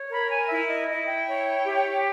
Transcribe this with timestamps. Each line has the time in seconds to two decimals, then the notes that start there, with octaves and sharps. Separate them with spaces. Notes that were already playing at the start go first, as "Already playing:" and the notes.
Already playing: C#5
0.10 A#4 B5
0.30 G#5
0.48 E4 E5
0.68 D#5
0.87 E4 D#5
1.07 G5
1.27 C#5
1.65 G4